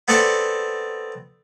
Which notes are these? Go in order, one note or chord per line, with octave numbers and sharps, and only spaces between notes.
B3 C4 A4 D5 F#5 A5